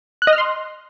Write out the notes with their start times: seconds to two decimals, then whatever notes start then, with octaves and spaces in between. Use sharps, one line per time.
0.22 F#6
0.27 D#5
0.33 F6
0.38 C6